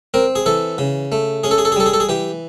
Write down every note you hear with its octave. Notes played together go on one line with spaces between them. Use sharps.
C4 A#4
G#4
E3 A4
C#3
A3
C#4 G#4
A4
G#4
A4
G#4
G3 A4
G#4
A4
G#4
E3 G4